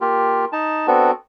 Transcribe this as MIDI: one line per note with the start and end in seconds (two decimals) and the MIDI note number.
0.01 0.45 58
0.01 0.45 65
0.01 0.45 67
0.53 0.86 63
0.53 0.86 81
0.87 1.11 59
0.87 1.11 60
0.87 1.11 62
0.87 1.11 66
0.87 1.11 69